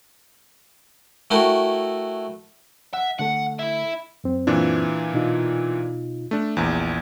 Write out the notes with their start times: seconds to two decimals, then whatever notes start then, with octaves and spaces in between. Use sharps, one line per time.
1.31 A3 E4 F#4 A#4 G5
2.93 E5 F#5
3.19 D3 A3 A4 F#5
3.59 E4 E5
4.24 F#2 C4
4.47 A#2 E3 D4
5.14 B2 D#4 F4
6.31 A3 D4
6.57 A#1 E2